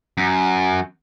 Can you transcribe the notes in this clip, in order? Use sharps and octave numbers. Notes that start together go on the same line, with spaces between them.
F#2